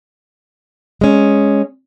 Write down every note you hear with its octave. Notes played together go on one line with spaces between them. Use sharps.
G#3 C#4